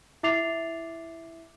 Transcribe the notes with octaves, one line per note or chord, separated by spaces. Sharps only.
E4 E5 D6 A6 C7 F7